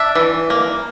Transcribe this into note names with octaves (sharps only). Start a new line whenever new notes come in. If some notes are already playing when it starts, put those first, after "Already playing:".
Already playing: D4 E5
E3
A#3